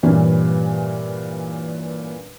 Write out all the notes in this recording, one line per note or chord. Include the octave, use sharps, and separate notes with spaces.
G2 A#2 E3 C#4